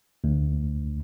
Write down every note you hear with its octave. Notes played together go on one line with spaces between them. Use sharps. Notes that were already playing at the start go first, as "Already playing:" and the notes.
D2